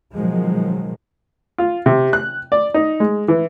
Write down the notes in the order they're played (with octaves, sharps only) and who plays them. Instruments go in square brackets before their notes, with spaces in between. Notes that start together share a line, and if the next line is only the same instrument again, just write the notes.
[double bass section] B2 D#3 F3 F#3 G#3
[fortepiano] F4
C3
F#6
D5
D#4
G#3
E3